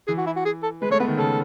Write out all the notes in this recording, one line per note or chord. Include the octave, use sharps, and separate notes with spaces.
E3 G#4
F#4
E4
F#4
G#4
A4
G#3 B4
A3 C#5
B3 B4
D#3
C#3 A4